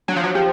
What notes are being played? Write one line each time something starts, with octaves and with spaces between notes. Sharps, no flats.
F#3 D4
F3
F#3
F3 G4